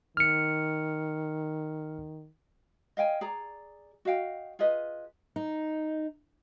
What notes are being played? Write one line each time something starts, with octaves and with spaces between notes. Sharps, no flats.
D#3 F6 C#7
D#5 F5 G5 G#5
G#4 D5 A#5
F#4 D#5 F5 G5
F4 G#4 B4 D#5
D#4